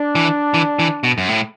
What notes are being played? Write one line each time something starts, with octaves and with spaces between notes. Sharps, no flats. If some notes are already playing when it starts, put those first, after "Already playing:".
Already playing: D4
E3
E3
E3
B2
F#2
A2